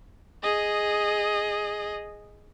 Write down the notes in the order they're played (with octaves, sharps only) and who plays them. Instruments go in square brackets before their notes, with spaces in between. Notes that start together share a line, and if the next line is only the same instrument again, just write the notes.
[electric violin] G#4 D#5